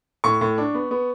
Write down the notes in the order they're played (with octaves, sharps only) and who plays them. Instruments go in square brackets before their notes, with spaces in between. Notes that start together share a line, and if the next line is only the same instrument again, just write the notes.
[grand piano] A2 C#6
A2
D4
B3
B3